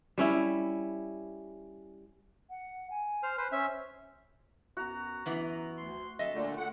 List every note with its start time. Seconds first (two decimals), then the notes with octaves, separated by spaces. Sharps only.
0.18 G3 C#4 E4
2.50 F#5
2.90 G#5
3.23 C5 F6
3.38 B4 C5
3.52 C#4 C5 E5
4.77 F#2 B3 F#4 A#5
5.26 F#2 E3 B3 A#5
5.77 D2 C6
6.19 F#3 C4 A4 D#5 E5
6.34 A#2 D3 A3
6.57 D3 F#5